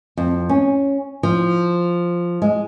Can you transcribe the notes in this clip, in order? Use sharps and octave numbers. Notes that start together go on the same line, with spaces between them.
F2
C#4
F3
G#3